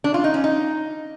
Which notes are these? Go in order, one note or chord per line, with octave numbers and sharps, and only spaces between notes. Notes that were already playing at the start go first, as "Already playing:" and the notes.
D4
F4
D#4
C#4
D#4